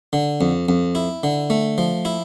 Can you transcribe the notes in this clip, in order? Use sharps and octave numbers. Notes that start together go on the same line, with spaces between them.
D3
F2
F2
E4
D3
A3
F3
E4